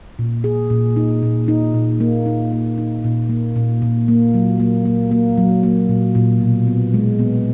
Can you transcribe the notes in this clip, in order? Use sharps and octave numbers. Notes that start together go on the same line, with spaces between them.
A#2
G#4
A#2
D#4
A#2
D#4
A#2
A#3
D#4
A#3
D#4
A#2
A#3
A#2
A#2
A#3
F#3
A#3
A#3
A#3
F#3
A#3
A#2
A#2
B2
B3
G#3
B3